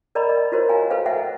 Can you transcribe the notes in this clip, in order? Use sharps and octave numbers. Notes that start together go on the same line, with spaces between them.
A#4 D5 D#5 A#5 B5
D#5
F4 F#4 A#4 C5 C#5
F5 G#5 A#5
A4 B4 C5 F5
C5 D#5 E5 F#5 G#5